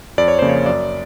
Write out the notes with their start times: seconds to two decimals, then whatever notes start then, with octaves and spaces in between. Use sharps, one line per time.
0.18 F2 D5
0.28 C#5
0.39 C#3 F3 A#3 C5
0.49 C#5
0.66 F#2 D5